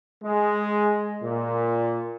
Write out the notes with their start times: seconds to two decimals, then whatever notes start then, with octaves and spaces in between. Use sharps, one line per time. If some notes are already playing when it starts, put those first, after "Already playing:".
0.23 G#3
1.23 A#2